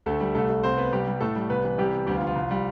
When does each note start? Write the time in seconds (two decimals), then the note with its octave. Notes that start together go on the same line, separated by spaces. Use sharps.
0.06 D2 A3 A4
0.21 G3
0.35 C2 A3 A4
0.50 A3
0.63 C2 C4 C5
0.77 B3 B4
0.92 C2 G3 G4
1.07 G3
1.20 A2 A3 A4
1.36 G3
1.50 C2 B3 B4
1.65 E3
1.78 C3 G3 G4
1.94 B3
2.07 D2 G3 G4
2.16 F4
2.21 F3
2.27 F4
2.36 C2
2.51 G3